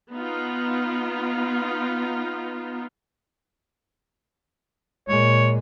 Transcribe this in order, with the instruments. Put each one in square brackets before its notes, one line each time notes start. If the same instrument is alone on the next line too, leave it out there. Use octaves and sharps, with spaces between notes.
[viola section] B3 D#4 F4
[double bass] A#2 G#3 [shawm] C#5